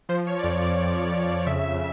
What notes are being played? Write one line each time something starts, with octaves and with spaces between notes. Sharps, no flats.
F3 C5
C#5
D5
F2 C#5
D5
F2
F2
C#3 E5